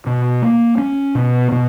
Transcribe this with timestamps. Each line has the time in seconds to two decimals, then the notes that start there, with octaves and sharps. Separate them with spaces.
0.06 B2
0.42 A#3
0.78 C#4
1.15 B2
1.52 B2